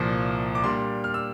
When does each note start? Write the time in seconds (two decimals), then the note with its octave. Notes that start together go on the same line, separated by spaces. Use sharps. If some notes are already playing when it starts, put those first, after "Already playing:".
Already playing: C2 A#2 F3
0.55 D6
0.64 A#2 G3 D4 C6
1.04 F6
1.14 E6